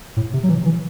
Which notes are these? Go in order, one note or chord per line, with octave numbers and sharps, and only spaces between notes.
A2
C3
F#3
E3
E3